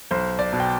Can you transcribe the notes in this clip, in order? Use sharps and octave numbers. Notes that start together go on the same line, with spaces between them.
B1 C5
D5
B2
G5